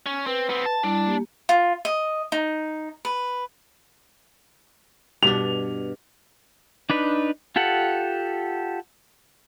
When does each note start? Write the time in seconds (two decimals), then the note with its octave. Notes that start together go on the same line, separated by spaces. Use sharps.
0.06 C#4
0.26 C4 B4
0.49 B3 C4
0.66 A5
0.83 G3 D4 E4
1.06 A#3 G4
1.49 F4
1.85 D#5
2.32 D#4
3.05 B4
5.23 G2 B2 D4 F7
6.90 D4 D#4 B4
7.56 F4 G4 A4 F#5